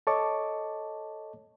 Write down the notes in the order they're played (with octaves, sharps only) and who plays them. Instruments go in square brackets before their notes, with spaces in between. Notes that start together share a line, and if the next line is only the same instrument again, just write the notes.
[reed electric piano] A4 C#5 D#5 A5 C#6 D6